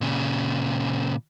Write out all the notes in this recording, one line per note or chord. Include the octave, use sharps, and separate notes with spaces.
A#2 C#3